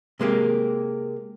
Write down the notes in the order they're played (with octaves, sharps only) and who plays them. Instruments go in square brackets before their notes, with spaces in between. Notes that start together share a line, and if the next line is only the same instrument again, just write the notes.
[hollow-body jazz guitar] C3 G#3 A#3 G4